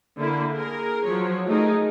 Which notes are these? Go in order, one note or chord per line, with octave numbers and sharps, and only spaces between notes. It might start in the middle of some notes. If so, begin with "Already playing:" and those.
D3 A#3 E4
G#4 A#4
F3 F#3 C#5
A3 D#4 G#4 A#4